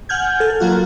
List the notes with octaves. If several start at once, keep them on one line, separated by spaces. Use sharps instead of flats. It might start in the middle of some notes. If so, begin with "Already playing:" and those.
F#5 G#5 F6 G6 G#6
A4
F#3 A#3 F4 F#4